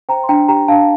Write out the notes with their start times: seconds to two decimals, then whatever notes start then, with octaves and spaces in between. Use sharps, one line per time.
0.09 C5 G5 A#5
0.24 C6
0.29 D4 G5 A#5
0.48 G4 G5 A#5
0.68 D4 F5 A5